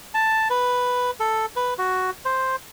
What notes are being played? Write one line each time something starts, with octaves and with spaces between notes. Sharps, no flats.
A5
B4
A4
B4
F#4
C5